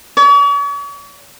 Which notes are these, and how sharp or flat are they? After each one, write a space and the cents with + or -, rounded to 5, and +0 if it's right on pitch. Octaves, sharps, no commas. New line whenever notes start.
C#5 +45